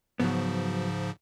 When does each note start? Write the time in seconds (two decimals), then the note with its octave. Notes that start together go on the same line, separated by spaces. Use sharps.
0.20 G#2 C#3 F3 F#3 B3